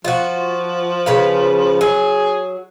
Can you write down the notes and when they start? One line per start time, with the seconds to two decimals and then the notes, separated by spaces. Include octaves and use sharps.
0.05 F3 F4 F#4
1.06 C#3 B4 F5
1.81 F#3 G#4